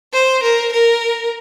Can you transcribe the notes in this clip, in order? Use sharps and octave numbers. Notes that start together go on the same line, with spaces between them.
C5
A#4
A#4